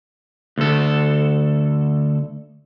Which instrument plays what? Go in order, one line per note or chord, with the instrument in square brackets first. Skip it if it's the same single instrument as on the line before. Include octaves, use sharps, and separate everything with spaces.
[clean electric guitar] D2 A4